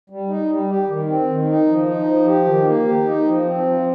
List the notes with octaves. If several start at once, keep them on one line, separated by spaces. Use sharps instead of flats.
G3
D#4
G3
G4
D#3
C4
D#3
D#4
F3
D#4
F3
G4
D#3
A#3
G4
D#4
F3
C4
F3